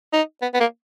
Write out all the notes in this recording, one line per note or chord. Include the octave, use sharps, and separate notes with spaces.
D#4
B3
B3
A#3